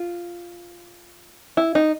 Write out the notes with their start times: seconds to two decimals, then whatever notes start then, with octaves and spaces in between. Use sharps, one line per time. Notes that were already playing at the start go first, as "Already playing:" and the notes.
Already playing: F4
1.57 E4
1.75 D#4